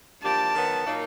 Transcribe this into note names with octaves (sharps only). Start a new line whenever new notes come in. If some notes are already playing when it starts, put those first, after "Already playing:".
F3 A#3 D4 G4 A5
D#3 F#3 B3
A#2 F#3 A#3 D#4